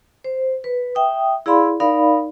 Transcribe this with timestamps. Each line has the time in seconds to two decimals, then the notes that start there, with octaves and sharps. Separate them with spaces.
0.24 C5
0.64 B4
0.95 E5 G5 D#6
1.46 E4 G#4 D5 F5 B5 C6
1.80 D#4 A#4 D5 F5 B5